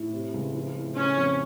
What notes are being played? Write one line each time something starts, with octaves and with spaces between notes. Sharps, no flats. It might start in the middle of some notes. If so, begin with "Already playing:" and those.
Already playing: A2
C3
C#2
F3
A2
C#3 C#4
F2